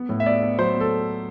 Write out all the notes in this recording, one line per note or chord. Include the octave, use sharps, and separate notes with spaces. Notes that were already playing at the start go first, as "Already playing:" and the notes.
Already playing: B3
A2
E5
B3 D5
B3
F#3 C5
B3
A4